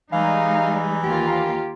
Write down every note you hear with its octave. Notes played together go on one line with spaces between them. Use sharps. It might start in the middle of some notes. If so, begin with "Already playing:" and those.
E3 G3 G#3 D#4 F5
D#2 A#3 F4 G4